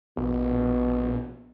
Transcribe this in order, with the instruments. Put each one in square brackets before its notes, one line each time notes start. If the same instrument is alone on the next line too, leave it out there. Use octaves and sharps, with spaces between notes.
[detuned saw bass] A#1 [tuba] B2